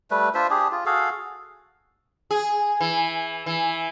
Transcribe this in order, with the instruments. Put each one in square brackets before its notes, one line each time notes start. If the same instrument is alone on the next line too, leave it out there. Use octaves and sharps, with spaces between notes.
[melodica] G3 A3 B4
D4 F4 C5 E5
D4 G4 G#4
F4
F#4 G#4 A4 F5
[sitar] G#4
E3
E3